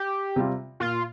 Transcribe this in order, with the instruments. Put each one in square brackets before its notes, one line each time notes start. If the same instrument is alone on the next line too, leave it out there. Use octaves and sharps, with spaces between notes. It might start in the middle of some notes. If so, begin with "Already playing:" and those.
Already playing: [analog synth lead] G4
[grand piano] C3 G3 C4 F4
[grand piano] A#2 [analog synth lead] F4